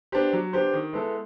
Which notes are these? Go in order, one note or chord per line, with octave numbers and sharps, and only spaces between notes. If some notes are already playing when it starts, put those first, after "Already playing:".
B3 D4 G4 C5
F#3
B3 D4 G4 C5
D#3
G#3 B3 E4 A4